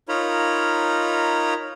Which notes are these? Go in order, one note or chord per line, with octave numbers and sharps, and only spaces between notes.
D#4 F4 A#4 C#5 A#5 B5